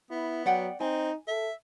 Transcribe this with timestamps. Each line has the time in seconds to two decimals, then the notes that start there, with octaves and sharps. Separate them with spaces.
0.10 B3 E4
0.46 F#3 D5 F#5 G5
0.80 C4 D#4 G#5
1.28 A4 E5